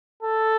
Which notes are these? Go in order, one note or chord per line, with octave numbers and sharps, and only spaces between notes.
A4